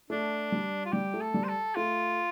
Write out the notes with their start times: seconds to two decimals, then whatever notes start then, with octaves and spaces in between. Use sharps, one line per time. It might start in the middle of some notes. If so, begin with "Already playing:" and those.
0.10 A3 D4
0.52 G3
0.85 F4
0.92 G3 G4
1.14 A3
1.21 A4
1.34 G3
1.44 C5
1.49 A4
1.76 A3 F4